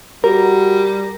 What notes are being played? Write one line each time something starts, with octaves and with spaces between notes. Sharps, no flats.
G3 F#4 A#4